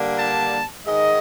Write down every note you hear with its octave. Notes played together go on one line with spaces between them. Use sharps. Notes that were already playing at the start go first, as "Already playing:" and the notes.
Already playing: D3 G3 A#3 D4
A5
G#2 D#3 G#3 D#5